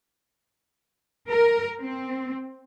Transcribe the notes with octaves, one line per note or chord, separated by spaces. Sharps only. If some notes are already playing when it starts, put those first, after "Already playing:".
A#4
C4